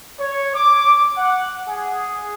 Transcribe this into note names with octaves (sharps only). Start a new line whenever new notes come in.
C#5
D6
F#5
G#4